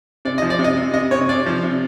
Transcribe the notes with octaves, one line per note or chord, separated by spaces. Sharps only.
C3 D5
D#5
F3
D5
C3
D#5
C3
C3 D#5
C3 C#5
C3 D5
F3
C3